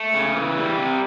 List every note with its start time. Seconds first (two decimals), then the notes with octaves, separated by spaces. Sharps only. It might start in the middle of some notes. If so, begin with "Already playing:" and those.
Already playing: A3
0.14 C#3
0.35 E3
0.57 G3
0.78 C3